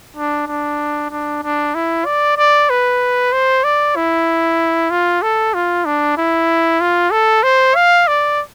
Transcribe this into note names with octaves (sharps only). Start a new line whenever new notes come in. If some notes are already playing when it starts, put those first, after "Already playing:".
D4
D4
D4
D4
E4
D5
D5
B4
C5
D5
E4
F4
A4
F4
D4
E4
F4
A4
C5
F5
D5